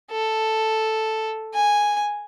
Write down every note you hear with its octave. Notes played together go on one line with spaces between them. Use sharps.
A4
G#5